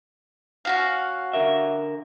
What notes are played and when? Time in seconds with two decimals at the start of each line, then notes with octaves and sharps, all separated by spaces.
0.65 C#4 F#4 F5
1.33 D3 A#4 E5